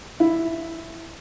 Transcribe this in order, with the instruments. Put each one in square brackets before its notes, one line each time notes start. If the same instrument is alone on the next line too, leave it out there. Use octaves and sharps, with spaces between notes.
[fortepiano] E4